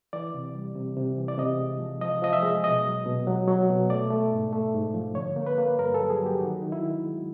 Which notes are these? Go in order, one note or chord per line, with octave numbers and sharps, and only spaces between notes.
E3 D5
C3
G3
C3
C3
E3
D5
C3 D#5
G#3
F3
F3 D#5
F3 D#5
E5
G#3
B2 D#5
F#3
B2
F#3
F#3
B2
A3 D5
A3
G#2
A3
G#2
F3
D3 C#5
A#3
B4
A#3
G2 A#4
A4
F#3
G#4
F#3
G4
D#3 F#4
D#3
E4
D#3
G#3